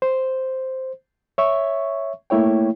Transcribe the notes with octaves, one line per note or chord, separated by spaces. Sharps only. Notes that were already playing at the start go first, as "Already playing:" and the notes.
C5
C#5 E5 C#6
A3 A#3 E4 C#5 G5